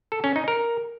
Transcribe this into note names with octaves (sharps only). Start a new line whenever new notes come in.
A4
C#4
D#4
A#4